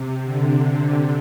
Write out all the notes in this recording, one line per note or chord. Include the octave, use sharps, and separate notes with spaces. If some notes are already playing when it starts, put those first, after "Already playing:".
Already playing: C3
D3